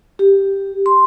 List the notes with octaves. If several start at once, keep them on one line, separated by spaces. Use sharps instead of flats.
G4
C6